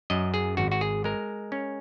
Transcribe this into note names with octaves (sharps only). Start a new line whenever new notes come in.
F#2 D#5
G#4
G#1 F#4
F#4
G#4
G#3 A#4
C#4